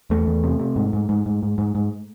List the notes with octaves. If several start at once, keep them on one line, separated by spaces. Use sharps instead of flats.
E2 A3
E2
C3
C3
G#2
G#2
G#2
G#2
G#2
G#2
G#2